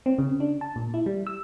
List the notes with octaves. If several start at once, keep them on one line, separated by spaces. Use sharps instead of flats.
C4
C#3
D4
A5
A#2
E4
G3
E6